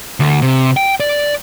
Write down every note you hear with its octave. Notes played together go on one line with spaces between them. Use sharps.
D2
C3
G5
D5